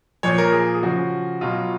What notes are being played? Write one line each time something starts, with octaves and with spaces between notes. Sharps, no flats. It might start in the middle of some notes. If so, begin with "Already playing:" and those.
A#2 F3 C#5
A#4
G#4
G#4
C#3 F3 F#4
B2 F#3 F4